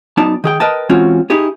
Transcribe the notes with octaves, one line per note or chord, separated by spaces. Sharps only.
F#2 B3 D#4 D5 A5
D#3 G#4 G5
A#4 B4 D#5 G5 A5
E3 G#3 C4 C#4 F4 F#4
D#4 E4 G4 G#4